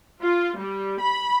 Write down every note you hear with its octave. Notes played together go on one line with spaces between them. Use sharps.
F4
G3
B5